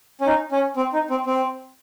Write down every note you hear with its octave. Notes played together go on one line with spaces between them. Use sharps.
C#4
D#4
C#4
C4
D#4
C4
C4